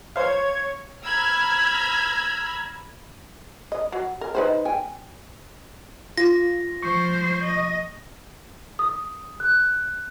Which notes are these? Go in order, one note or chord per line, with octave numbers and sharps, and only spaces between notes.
C5 C#5 F5 G#6
A#5 B5 E6 F6 G#6
D#5
F#3
A#4
D#4 B4 C5
G5 G#5
F4 A#6
F3 C5 C#6
D#5
D#6
F#6